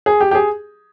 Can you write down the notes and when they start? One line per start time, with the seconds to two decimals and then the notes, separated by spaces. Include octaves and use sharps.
0.06 G#4
0.20 G4
0.31 G4
0.35 G#4